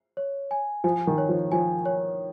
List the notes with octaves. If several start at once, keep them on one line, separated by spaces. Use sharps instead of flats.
C#5
G#5
F3 G#5
D#3
C#5
F3
F3 G#5
C#5